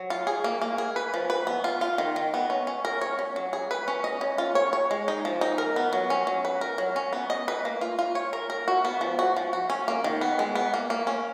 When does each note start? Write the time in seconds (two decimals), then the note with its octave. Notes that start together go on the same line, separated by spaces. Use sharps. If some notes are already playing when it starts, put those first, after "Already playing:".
Already playing: F#3
0.10 F4
0.27 G#4
0.44 A#3
0.61 A#3
0.78 G#4
0.96 B4
1.14 F3
1.30 B4
1.47 B3
1.64 F4
1.81 F4
1.98 D#3
2.16 D#3
2.34 B3
2.50 C#4
2.67 C#4
2.85 A#4
3.01 C#5
3.19 C#4
3.36 F#3
3.53 G#4
3.71 B4
3.88 C#4
4.04 D#5
4.21 C#4
4.38 F4
4.55 C#5
4.73 C#5
4.91 G#3
5.08 D#4
5.25 F3
5.41 D#4
5.58 A#4
5.76 B3
5.93 F#3
6.10 C#4
6.27 F#3
6.45 B4
6.61 A#4
6.78 F#3
6.96 C#4
7.13 B3
7.30 D#5
7.48 B4
7.65 A#3
7.81 F4
7.99 F4
8.15 C#5
8.33 A#4
8.50 A#4
8.68 F#4
8.85 B3
9.01 F3
9.19 F#4
9.36 F3
9.53 F#4
9.70 C#4
9.88 A#3
10.04 D#3
10.21 B3
10.39 G#3
10.55 B3
10.74 A#3
10.90 A#3
11.07 C#4